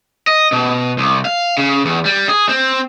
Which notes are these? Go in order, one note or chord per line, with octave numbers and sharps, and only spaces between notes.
D#5
B2
C2
F5
C#3
E2
G3
G#4
C4